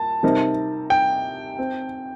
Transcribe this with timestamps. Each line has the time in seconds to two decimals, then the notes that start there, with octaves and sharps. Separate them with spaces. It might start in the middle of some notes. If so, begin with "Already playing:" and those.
Already playing: A#2 A5
0.23 C3 G3 C4 D#4 A#4
0.90 G5
1.59 C4